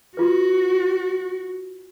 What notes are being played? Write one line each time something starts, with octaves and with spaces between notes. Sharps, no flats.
F4 F#4 B4